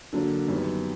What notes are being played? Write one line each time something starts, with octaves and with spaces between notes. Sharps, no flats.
D3 F#3 A#3 D4
F#2 D#3 G3 B3